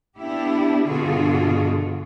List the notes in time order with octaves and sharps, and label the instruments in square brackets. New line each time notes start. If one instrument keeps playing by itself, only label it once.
[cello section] B3 D4 E4 G4
G2 B2 D3 F4 F#4 G#4